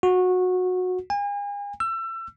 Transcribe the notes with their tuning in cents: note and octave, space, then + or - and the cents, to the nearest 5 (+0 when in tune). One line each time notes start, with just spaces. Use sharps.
F#4 -20
G#5 -40
E6 +30